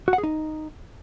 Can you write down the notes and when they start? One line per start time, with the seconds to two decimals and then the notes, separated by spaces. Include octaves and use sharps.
0.08 F#4
0.13 F#5
0.18 G#4
0.23 D#4